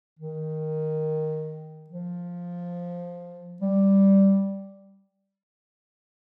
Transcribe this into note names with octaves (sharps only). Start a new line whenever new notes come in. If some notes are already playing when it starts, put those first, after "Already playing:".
D#3
F3
G3